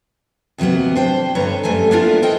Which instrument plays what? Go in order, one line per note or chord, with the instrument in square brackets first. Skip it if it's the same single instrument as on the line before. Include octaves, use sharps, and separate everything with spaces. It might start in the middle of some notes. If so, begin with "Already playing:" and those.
[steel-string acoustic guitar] D#2 C3 F#3 A#3 B3
D4 C5 G5
G2 D3 B4 C#5 A#5
F#2 G3 A3 A4 G#5
A#3 B3 D4 E4 F4 A#4
A4 A#4 C5 D#5 G5